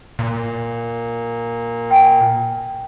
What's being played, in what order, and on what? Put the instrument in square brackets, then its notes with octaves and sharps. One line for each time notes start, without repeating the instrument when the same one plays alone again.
[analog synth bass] A#2
[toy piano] G5 G#5